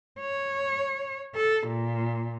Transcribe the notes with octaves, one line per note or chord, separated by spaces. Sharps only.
C#5
A4
A#2